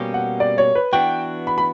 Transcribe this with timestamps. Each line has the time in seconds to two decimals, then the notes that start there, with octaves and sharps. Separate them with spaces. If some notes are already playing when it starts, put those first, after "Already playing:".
Already playing: B2 G3 A#3 C#4 G4
0.14 F#5
0.40 D5
0.58 C#5
0.75 B4
0.93 E3 B3 D4 F#4 G5
1.47 B5
1.58 B5